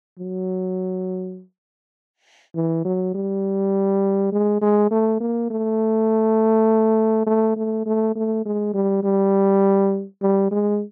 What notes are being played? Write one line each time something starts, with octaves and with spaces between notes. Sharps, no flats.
F#3
E3
F#3
G3
G#3
G#3
A3
A#3
A3
A3
A3
A3
A3
G#3
G3
G3
G3
G#3